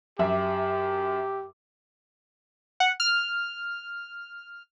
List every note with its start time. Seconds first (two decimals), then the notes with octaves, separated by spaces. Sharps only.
0.19 F#2 G4 E5 D6
2.80 F#5
3.00 F6